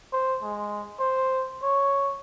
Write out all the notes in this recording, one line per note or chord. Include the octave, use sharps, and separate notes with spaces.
C5
G#3
C5
C#5